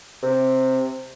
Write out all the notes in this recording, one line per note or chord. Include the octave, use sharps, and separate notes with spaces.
C3